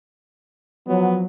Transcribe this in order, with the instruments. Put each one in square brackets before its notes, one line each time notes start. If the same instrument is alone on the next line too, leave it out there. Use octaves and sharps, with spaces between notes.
[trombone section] F3 F#3 [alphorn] B3